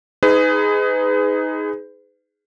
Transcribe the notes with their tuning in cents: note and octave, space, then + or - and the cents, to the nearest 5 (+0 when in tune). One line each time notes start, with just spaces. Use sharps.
D#4 +15 G#4 +0 B4 +35